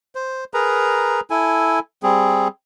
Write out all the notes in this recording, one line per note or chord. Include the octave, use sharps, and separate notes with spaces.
C5
G#4 A#4 B4 A#5
E4 A4 G#5
G3 C4 G#4